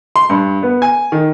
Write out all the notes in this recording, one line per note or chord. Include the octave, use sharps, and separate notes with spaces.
C6
G2
B3
G#5
D#3